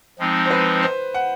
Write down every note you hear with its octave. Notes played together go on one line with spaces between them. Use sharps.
F3 G#3 C4 D#4
C5
B4
C5
F#5